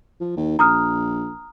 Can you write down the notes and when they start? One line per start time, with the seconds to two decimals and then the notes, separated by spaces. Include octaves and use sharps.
0.21 F3
0.37 D#2
0.59 A#1 A#5 D#6 F6